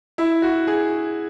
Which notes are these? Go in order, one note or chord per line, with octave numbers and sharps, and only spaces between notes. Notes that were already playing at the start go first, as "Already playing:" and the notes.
E4
F#4
G#4